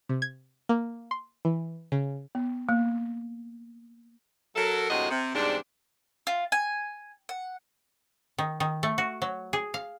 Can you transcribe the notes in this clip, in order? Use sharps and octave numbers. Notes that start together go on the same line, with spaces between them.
C3
G#6
A#3
C6
E3
C#3
B3
A#3
F#3 A4 A#4
D2 A2 C3 G#3 F#4 D#5
C3
E2 G#2 C3 G3 D4
F4
G#5
F#5
D#3
D#3
A3
F#4
F#3
G#4
F5